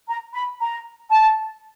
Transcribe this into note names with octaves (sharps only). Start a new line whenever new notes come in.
A#5
B5
A#5
A5